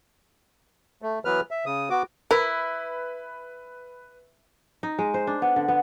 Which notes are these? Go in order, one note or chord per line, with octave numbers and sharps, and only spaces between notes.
A3
E3 F#3 B3 B4 F6
E5
C#3 D#6
B3 F#4 D6
E4 A#4 B4
D#4
G#3
C5
D4
B3
D3
B3